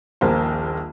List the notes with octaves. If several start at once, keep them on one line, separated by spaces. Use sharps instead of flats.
D#1 A#1 A#3 C5